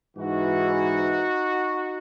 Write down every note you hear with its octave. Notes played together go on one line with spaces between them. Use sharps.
G#2 E3 D#4 F#4